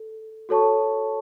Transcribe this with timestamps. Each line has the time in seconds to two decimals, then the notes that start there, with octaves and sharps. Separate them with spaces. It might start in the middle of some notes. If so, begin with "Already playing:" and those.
Already playing: A4
0.49 F#4 A4 C#5 A5 C#6